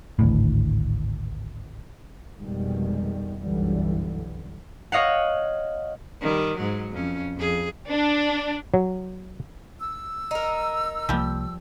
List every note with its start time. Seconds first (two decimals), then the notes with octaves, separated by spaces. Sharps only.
0.19 G#1 D2 A2
2.38 F1 F2 B2 D#3 G3 G#3
3.40 F1 B1 F#2 D3 E3 G3
4.92 C#5 D#5 F5 F#5
6.21 D#3 G3
6.56 G#2 F#3
6.92 F2 C#4
7.36 F2 G#4
7.89 D4
8.74 F#3
9.80 E6
10.31 D#4 A#4
11.09 C2 F3 G3 A#3